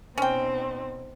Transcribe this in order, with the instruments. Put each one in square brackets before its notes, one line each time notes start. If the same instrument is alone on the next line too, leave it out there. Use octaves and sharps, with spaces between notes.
[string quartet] B2 C4 D#4 [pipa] C#4 G5